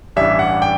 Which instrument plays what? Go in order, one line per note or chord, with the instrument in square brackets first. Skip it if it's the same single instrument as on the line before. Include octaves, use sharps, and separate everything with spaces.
[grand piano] A1 G2 E3 G3 D4 E5
F#5
G5